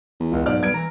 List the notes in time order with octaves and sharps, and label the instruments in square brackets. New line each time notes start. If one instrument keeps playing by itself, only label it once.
[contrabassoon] E2
[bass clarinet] C#2 [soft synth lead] F4
[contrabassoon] B1 [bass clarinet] G#2 [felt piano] D5 F6
[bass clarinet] G3 [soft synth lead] B3 [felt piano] G#6 D7
[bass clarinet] E3 [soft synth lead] A#5